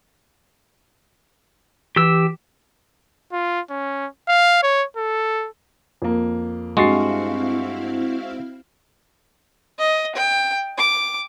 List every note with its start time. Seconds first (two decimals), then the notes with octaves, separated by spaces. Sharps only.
1.96 E3 G4 E6
3.32 F4
3.70 C#4
4.28 F5
4.63 C#5
4.97 A4
6.02 F2 A#3
6.77 G2 G#3 C4 E4 F#4 F5 A6 C7
9.79 D#5
10.15 G5
10.78 D6